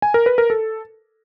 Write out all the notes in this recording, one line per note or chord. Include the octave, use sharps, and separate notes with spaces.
G#5
A#4
B4
A#4
A4